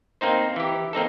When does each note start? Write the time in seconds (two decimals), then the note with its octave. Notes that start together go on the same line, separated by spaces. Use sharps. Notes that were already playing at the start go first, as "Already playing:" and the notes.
0.21 A#3 C4 D#4 C5
0.56 E3 G4
0.93 A#3 C4 D#4 A4